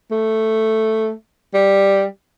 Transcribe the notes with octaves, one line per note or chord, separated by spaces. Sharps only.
A3
G3